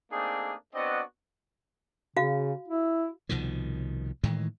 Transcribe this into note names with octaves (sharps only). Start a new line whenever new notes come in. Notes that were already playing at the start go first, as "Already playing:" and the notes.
A3 A#3 C4 D4 D#4 G#4
B3 C4 D4 F#4 D5 D#5
C#3 F#4 F5
E4
C2 B2 D#3 F3
A2 D#3 E3 G#3